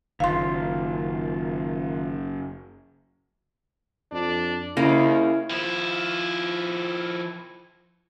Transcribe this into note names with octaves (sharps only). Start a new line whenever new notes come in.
F#1 D#3 F4 F5 C6
F2 D4
D#2 C#3 A#3 E4
F3 E4